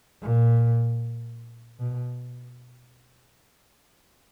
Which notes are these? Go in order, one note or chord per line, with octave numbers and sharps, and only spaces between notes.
A#2
B2